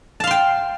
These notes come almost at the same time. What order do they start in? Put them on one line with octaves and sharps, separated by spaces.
A5 F5 C6 G5